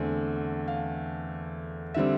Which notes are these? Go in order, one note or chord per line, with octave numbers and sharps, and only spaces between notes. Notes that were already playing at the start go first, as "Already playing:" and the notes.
Already playing: E2 D3 A3 C4
F5
D3 G3 C4 E5